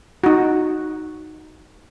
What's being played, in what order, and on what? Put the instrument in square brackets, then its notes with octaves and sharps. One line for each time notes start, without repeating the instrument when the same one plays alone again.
[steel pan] D#4 F#4